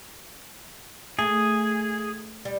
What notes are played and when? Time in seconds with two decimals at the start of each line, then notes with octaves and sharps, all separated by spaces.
1.19 A3 G#4
2.45 G3